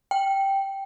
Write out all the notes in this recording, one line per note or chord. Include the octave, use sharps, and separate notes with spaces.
G5